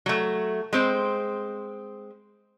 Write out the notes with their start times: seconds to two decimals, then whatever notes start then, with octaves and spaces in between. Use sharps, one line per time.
0.06 F#3 A3
0.73 G#3 C4 C5